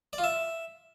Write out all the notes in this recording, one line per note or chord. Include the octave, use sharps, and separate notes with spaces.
D5
F4
E5